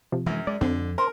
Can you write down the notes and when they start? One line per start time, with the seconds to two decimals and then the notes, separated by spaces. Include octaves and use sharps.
0.12 C3 F3
0.26 F#2 E3 G#3
0.47 G#3 D5
0.61 F2 D3 C4
0.98 A#4 C5